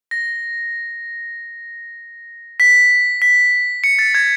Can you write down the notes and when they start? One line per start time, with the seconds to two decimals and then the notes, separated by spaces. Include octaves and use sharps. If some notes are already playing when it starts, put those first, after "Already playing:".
0.11 A#6
2.60 B6
3.22 B6
3.84 C#7
3.99 A6
4.15 G#6